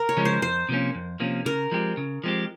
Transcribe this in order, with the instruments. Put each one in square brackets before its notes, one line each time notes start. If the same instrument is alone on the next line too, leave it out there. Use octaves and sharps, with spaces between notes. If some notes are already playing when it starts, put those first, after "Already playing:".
Already playing: [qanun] A#4
C#5
[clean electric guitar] C#3 F3 G#3 C#4
[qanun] C5
[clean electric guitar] F2 [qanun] C5
[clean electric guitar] C3 F3 A#3 C#4
F2
C3 F3 A#3 C#4
[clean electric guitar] C#3 [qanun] A#4
[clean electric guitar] F3 G#3 C4 G4
C#3
F3 G#3 C4 G4